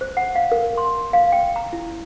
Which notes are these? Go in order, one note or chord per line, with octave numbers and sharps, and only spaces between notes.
C5
F#5
F5
A#4
C6
F5
G5
A#5
E4